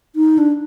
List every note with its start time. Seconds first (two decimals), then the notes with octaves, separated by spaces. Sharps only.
0.16 D#4
0.38 D4